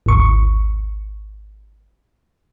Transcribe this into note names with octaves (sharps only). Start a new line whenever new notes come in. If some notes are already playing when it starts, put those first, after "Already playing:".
G#1 D2 C#6